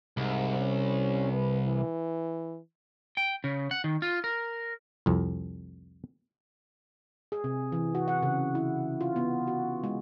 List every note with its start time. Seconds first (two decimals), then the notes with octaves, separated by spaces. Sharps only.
0.17 C2 G#2
0.60 C#4
1.32 B4
1.66 E3
3.17 G5
3.44 C#3
3.71 F#5
3.84 D#3
4.02 F4
4.24 A#4
5.06 C2 F2
7.32 G#4
7.44 C3
7.72 E3
7.95 F#4
8.08 F#5
8.23 C#3
8.55 E4
9.01 F4
9.16 B3
9.47 F#4
9.84 G#3